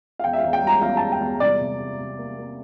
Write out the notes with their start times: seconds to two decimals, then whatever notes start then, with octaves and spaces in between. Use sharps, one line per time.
0.19 F5
0.24 E2 G5
0.33 E5
0.38 E2 F5
0.53 G5
0.63 G3 A#5
0.81 E2 F5
0.97 E2 A5
1.12 G5
1.21 E2
1.40 C2 D5
1.61 C3
1.79 C3
1.99 C3
2.19 A#3
2.39 A#3